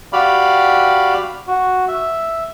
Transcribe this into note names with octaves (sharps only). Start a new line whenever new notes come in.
F#4 G4 D5 F5 B5
F#4
E5